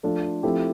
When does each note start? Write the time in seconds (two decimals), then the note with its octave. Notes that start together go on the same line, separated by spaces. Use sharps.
0.03 F3 A3 D4 F4 A4
0.43 F3 A3 C4 E4 G4